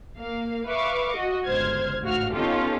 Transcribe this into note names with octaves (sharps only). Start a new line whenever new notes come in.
A#3 F5
B4 E5 F5 C#6 D6
F#4 D#5
G1 C#2 C5 F6 G#6
A1 D2 G#2 F#4 F5 F6
B3 C#4 D#4 F4 G4 A4